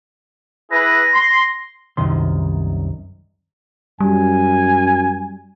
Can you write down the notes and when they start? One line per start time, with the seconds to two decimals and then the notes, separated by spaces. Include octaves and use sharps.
0.71 E4 G#4 B4 A#6
1.13 C6
1.97 C2 F#2 D#3 C6
4.00 F#2 G3 G#5